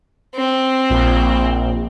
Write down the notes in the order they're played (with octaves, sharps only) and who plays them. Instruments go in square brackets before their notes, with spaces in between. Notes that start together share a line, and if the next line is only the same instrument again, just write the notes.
[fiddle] C4
[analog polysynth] A#1